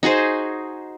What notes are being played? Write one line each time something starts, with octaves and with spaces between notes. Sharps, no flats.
D#4 F#4 G#4 C5